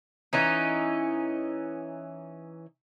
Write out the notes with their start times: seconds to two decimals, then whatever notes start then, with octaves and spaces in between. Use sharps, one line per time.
0.33 E3 C#4 D#4